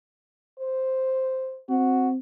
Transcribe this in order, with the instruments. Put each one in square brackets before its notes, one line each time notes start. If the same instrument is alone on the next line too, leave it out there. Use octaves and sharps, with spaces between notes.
[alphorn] C5
[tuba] C4 [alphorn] F#4